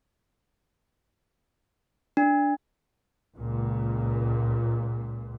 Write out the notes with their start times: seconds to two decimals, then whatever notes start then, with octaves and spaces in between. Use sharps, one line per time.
2.17 D4
3.37 C#2 A#2